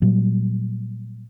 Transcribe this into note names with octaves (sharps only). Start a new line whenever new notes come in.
A#2 F#3 G3